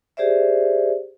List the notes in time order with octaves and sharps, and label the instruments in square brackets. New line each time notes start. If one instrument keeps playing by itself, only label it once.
[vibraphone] G4 G#4 C5 D5 E5